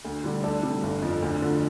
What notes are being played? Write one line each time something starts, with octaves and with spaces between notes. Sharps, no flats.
D2
D3 G3
D2 A4 D5
C3 G3
G1
F2 F3
D2
D3 F3